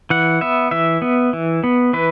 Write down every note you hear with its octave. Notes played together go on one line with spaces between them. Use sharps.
E3 F#5
B3 E5
E3 E5
B3
E3
B3
E3 B4